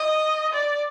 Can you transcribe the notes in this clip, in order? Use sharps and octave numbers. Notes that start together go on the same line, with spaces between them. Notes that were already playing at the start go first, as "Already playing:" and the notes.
Already playing: D#5
D5